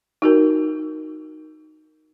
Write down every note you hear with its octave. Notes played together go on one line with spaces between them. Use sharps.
D#4 F#4 A#4